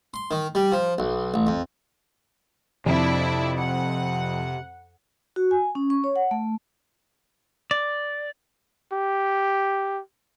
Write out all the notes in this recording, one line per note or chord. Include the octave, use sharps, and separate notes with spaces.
C6
D#3
G3
F3
B1
A1
F2
F2 C3 D4 E4 D5
F#5
F#4
G#5
C#4
C#6
C#5
F#5
A3
D5
G4